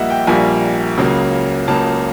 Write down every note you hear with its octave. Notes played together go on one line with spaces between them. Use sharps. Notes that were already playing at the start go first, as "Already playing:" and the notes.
Already playing: A#1 A#2 G3 A#3 D#5 E5 F#5
G5
A#1 A#2 G3 A#3 G#5
C#2 C#3 F#3 A#3
C#2 C#3 F#3 A#3 A5